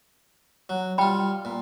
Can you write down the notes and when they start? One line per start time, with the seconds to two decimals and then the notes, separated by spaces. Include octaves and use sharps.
0.69 F#3
0.98 G3 F4 G5 B5
1.45 A#2